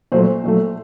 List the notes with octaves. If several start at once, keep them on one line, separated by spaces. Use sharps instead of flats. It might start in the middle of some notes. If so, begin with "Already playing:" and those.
A#2 F#3 A3 C5
A#2 F#3 A3